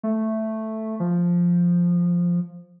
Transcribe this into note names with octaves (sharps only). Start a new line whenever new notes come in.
A3
F3